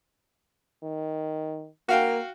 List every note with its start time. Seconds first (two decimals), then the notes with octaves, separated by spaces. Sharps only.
0.83 D#3
1.89 A#3 F#4 F5 G5